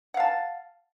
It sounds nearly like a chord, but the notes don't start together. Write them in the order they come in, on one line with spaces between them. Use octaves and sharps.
F#5 F5 A5